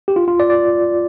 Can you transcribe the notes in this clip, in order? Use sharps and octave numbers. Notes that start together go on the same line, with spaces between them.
G4
F4
F4
D5
D5